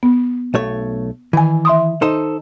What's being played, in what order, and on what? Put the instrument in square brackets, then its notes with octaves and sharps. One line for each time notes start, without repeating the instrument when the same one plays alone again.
[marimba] B3
[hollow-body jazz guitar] B1 A3 C#5
[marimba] D#3 G#5 [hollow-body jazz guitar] E3
[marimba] E5 C6 D#6
[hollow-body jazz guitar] D#4 A4 C5